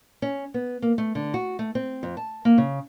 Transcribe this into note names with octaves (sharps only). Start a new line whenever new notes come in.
C#4
B3
A#3
A3
D3
F#4
A3
C4
F2
A5
A#3
C#3